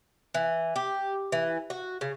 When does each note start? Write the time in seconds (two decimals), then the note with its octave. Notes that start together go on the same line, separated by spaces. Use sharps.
0.34 E3
0.76 G4
1.32 E3
1.70 F#4
2.01 C#3